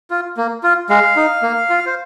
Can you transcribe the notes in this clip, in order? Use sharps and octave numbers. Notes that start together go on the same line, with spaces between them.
F4
A#3
F4
G#3 F5
D#4
A#3
F4
C5